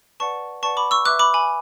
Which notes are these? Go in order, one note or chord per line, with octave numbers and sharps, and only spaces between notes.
B4 D5 F#5 A5 C#6
B4 D5 F#5 A5 C#6
B5 D6
C#6 E6
B4 E5 D6 F#6
B5 D6
G#5 B5